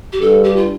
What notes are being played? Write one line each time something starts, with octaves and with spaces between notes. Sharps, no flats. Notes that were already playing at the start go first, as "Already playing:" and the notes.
G4
G2 A4
G4
F4